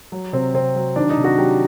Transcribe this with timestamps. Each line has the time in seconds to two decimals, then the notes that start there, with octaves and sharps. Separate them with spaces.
0.12 F#3
0.33 C3 C4
0.54 C3 C4
0.76 F#3
0.96 D#3 D4
1.10 D#4
1.17 C3
1.24 F#4
1.38 F#3 G4